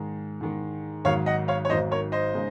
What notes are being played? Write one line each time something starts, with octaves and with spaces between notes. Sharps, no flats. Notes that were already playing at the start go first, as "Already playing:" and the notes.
Already playing: G#2 D#3 G#3
G#2 D#3 G#3
G#1 G#2 D#3 F#3 C#5 F5
D#5 F#5
C#5 F5
C#5
G#1 G#2 D#3 F#3 C5 D#5
A#4 C#5
C5 D#5
C#3 G#3 D#4